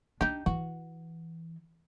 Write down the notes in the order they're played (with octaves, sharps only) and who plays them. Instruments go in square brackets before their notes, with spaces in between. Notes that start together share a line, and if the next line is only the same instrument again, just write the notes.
[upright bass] D4 [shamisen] D#4 G4
[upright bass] E3 [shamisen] F#4